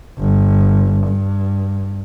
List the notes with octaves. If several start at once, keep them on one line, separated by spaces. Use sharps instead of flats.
G1
G2